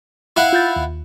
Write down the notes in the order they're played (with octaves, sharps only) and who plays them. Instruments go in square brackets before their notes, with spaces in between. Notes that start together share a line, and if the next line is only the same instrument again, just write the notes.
[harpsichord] E4 F5 F#5
[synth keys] F4 G6 A6
D#2